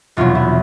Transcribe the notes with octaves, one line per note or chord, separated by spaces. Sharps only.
F1 E2 B2 F#3 F4
E4